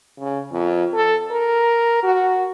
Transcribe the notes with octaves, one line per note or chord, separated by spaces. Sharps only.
C#3
F2
A4
A#4
F#4